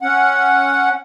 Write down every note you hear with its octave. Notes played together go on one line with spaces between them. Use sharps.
C#4 F#5